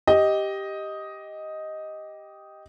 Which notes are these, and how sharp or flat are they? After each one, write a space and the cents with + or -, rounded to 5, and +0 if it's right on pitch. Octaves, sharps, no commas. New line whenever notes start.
G4 +0 D#5 +5